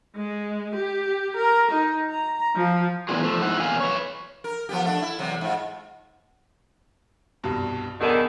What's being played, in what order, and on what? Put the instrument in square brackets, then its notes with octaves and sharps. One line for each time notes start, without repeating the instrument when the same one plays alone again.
[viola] G#3
G4
A#4
D#4
A#5
F3
[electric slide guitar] A2 E3 B3 D4 F4 G#4
F3 A3
G#2 E4 F#5
E2 A#2 F5 G#5
B4 C#5
[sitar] A#4
F3 B3 G4
A3 D4
E4
E2 C3 F#3
G#2 F4
[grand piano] C2 G2 B2
[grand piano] D1 B3 G#4 [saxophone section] B2 D3 D#3